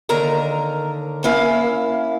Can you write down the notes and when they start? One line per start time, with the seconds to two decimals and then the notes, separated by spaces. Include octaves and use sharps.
0.09 D#2 D3 A#4 A#5
1.24 A#3 C#4 E4 F5